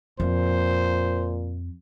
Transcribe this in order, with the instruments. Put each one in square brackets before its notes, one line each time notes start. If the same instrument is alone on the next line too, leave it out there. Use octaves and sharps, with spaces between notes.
[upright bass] F2 [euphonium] A#2 [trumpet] C5